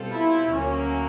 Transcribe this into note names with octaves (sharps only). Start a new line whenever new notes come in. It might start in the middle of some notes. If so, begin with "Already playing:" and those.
Already playing: B2 G3 C4 F4 A4
E4
D2 C#3 F#3 A#3 C#4